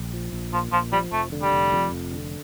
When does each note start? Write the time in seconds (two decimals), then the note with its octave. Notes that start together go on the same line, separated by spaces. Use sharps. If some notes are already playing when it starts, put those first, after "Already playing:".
Already playing: A#1
0.13 F3
0.33 A#1
0.53 A#2 F3
0.72 A#1 F3
0.92 F3 G3
1.12 F1 A3
1.32 D3
1.42 G3
1.52 F1
1.73 F2
1.93 F1
2.12 D3